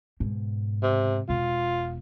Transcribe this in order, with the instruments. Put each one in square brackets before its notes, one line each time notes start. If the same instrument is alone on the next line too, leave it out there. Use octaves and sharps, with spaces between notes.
[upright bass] G#2 B2
[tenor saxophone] C3
[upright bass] E1 B2 [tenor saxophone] F4